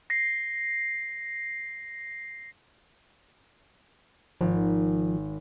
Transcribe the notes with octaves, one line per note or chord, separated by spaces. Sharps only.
A#6 C7
G#1 F3